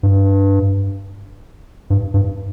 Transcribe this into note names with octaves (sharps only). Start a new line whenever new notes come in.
G2
G2
G2